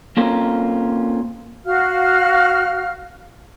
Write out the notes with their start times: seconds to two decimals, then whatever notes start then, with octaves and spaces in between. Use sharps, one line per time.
0.17 A#3 C4 C#4 F4 A4 A#4
1.65 F#4 F5 F6